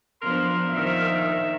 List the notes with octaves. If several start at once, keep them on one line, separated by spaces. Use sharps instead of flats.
F3 B3 D4 A#4 C6
A#2 D#3 F3 E5